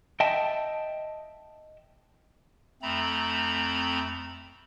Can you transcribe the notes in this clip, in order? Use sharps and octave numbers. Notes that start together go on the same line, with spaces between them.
D#5 E5 G5 A5
F2 A3 C4 A#5 B5